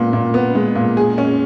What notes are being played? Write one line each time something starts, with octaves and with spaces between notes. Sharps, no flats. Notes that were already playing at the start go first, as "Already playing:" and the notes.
Already playing: A#2 G#3 B3
A#2
B3
G#3
A#2
G#4
C#4